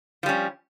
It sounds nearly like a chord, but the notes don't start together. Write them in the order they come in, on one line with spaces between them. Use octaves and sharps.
F3 G3 C#4